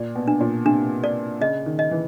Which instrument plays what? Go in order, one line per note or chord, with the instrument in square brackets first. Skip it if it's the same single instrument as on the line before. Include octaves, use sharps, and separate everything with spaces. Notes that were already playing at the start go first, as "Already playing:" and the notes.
Already playing: [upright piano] A#2 [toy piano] D5
[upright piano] B2
[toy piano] D4
[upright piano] A#2
[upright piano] C3 [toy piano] D4
[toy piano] D5
[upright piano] C#3 [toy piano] D#5
[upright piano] D#3
[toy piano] D#5
[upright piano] E3